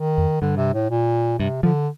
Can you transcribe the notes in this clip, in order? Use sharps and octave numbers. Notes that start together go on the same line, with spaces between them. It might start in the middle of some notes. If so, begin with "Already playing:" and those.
Already playing: D#3
F2
G2 D3
C3
A2
A#2
G2 C3
D3 F3